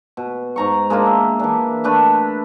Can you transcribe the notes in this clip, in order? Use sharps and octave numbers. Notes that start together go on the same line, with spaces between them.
B2
G#2 A#5 C#6
G#3 A#3 D4 F4
E5
E3 D4
A3 D4 B4